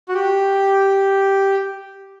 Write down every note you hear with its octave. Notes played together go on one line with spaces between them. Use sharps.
F#4
G4